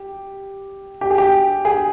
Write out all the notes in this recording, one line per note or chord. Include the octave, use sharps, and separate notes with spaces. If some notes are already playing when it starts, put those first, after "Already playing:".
Already playing: G4
G4
G#4
G4
G#4